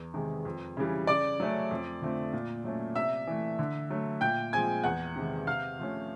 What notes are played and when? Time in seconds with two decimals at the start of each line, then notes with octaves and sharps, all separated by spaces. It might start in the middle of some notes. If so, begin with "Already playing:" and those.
Already playing: E2
0.14 C3 D#3 G#3
0.45 F2
0.77 C#3 E3 G3
1.07 C#3 D5 D6
1.40 F#3 A3 C#4
1.71 F2
2.01 D3 F3 A3 C4
2.33 A#2
2.64 F#3 A3 C#4
2.95 C3 E5 E6
3.27 E3 A3
3.59 D3
3.90 F#3 A3
4.21 A#2 G5 G6
4.53 F3 G#3 C4 G#5 G#6
4.84 E2 F#5 F#6
5.16 C3 D#3 G#3
5.47 C3 F5 F6
5.79 F3 A3 C#4